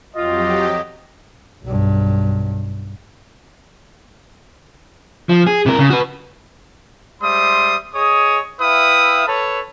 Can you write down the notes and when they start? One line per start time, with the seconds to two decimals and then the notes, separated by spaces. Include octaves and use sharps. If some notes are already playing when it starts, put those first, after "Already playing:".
0.16 F2 F#3 F4 G4 D#5
1.63 B1 G2
5.29 F3
5.47 G#4
5.66 C3 A#4
5.79 C#3
5.90 F#4 B4
7.22 G3 G#3 C5 E5 C6 D#6
7.94 G#4 C#5 D#5 D#6
8.60 E4 B4 E5 F5 G5 D#6
9.27 A4 B4 C#5 A5